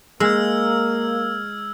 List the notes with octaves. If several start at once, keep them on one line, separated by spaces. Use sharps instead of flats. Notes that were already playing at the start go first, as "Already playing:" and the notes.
G#3 A#3 E6 F6 G#6